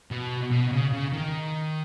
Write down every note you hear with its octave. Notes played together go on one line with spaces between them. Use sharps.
B2
B2
C#3
C#3
D#3